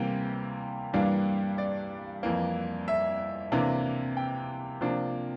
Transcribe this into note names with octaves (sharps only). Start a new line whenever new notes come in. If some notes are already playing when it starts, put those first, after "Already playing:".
Already playing: C3 E3 G3 A#3 G5
G2 E3 G3 A#3 D4 F5
D5
F2 E3 A#3
E5
C3 E3 A#3 D4
G5
C3 F3 A#3 D4